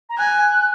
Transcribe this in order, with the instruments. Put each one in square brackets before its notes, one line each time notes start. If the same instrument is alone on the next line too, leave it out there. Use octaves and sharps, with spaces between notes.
[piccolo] A#5
[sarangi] G#5 [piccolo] F#6